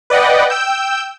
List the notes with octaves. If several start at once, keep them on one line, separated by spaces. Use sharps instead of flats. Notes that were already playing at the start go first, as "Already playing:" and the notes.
B4 D5 D#5 F#5 G5
G5 E6 G6